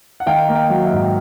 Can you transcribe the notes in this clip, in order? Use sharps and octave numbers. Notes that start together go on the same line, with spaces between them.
F#5
D#3 F5 G5
A#3
F5 G5
F#3
E5 F#5
G#2
G5